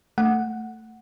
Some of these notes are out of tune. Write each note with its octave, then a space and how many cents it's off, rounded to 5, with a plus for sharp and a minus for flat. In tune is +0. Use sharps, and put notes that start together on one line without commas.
A3 +10 F#5 +0